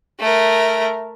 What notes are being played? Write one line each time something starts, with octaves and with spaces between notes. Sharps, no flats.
A3 A#4